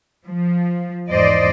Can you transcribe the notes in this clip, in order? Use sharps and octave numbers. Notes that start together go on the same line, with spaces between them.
F3
E2 G#2 C5 D5 D#5